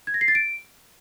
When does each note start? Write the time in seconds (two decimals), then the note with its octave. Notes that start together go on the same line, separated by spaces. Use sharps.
0.07 G#6
0.14 A#6
0.21 C7
0.28 A6
0.35 D7